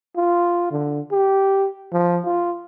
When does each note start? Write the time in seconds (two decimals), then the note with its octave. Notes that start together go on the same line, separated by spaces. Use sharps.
0.17 F4
0.71 D3
1.12 G4
1.93 F3
2.25 F4